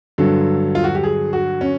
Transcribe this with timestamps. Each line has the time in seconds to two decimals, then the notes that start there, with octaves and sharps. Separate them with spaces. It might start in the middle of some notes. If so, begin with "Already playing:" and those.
0.18 G2 D3 F#3 A4
0.75 F4
0.84 F#4
0.95 G4
1.03 G#4
1.33 F#4
1.61 C#4